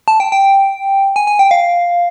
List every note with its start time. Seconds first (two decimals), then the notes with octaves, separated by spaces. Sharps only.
0.08 A5
0.20 G5
0.32 G5
1.16 G#5
1.27 G#5
1.39 G5
1.51 F5